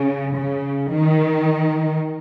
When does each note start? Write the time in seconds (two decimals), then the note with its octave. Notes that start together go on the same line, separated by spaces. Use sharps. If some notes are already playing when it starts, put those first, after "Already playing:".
Already playing: C#3
0.36 C#3
0.93 D#3